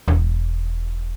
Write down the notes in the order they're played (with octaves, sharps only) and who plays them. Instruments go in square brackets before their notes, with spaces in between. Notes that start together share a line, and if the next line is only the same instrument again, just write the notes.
[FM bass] E1